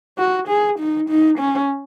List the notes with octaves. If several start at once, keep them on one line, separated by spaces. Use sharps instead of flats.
F#4
G#4
D#4
D#4
C#4